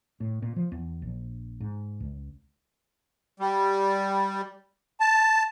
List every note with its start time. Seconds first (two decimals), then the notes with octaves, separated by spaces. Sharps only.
0.20 A2
0.42 A#2
0.56 F3
0.72 E2
1.02 A#1
1.60 G#2
2.00 C#2
3.40 G3
5.00 A5